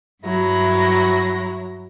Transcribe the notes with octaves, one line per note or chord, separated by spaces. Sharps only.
G2 F#3 E4 A#6